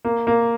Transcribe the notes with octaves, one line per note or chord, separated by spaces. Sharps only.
A#3
A#3